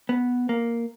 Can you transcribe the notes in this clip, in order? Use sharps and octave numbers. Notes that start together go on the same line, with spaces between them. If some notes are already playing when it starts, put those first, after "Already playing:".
B3
A#3